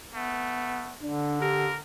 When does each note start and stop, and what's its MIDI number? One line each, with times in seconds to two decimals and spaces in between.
0.14 0.97 57
0.14 0.95 59
1.02 1.81 50
1.02 1.39 62
1.41 1.70 67
1.41 1.78 70